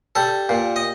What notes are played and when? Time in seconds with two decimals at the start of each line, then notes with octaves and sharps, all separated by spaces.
0.15 G3 A4
0.49 A#2
0.76 D#5